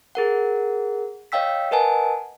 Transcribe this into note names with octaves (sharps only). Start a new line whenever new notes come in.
G#4 A#4 F#5
C#5 D#5 F5 G5 E6 B6
A#4 B4 D#5 F#5 G#5 A5